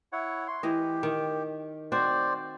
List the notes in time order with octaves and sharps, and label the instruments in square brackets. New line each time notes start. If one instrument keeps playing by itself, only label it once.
[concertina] E4 C#5 F#5
C6
[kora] E3 D#5 [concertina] G4
[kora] D#3
[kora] C4 F#4 [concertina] C5 D5